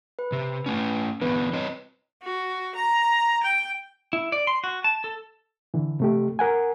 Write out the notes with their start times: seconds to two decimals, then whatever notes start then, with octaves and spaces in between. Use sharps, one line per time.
0.19 B4
0.32 C3
0.66 A3 C#4
1.21 D3 E3 B3 B4
1.53 C4 C#5 D#5
2.22 F#4
2.75 A#5
3.43 G5
4.13 E4
4.32 D5
4.47 C6
4.64 F#4
4.84 A5
5.04 A4
5.74 D3 E3
6.00 C3 A3 G4
6.39 A#4 F#5 G#5